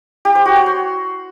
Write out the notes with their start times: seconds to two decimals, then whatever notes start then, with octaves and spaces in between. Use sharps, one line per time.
0.25 G4
0.35 C5
0.46 F#4
0.56 C#5
0.66 C6